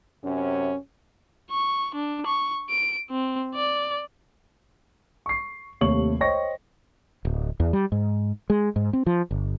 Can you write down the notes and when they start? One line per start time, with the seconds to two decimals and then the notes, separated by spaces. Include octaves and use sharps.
0.23 F#2 C3 C#4
1.51 C#6
1.95 D4
2.26 C#6
2.70 D7
3.11 C4
3.55 D5
5.26 C#6 C7
5.81 D#2 C3 A3 C#5 C#6 F#7
6.20 C5 C#5 D#5 G5 C#6 A#6
7.25 D1
7.60 E2
7.73 G3
7.92 G#2
8.50 G#3
8.76 G#2
8.93 C4
9.07 F3
9.31 G1